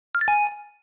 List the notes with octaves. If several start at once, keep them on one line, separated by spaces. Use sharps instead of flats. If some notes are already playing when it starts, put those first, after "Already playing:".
F6
A6
G#5